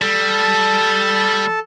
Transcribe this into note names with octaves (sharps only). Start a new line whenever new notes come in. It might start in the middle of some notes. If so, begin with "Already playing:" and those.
G3 A4 A5